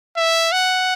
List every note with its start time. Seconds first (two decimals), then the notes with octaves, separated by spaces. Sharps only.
0.17 E5
0.52 F#5